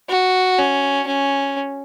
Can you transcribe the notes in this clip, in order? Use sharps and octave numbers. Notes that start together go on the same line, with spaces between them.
F#4
C#4
C#4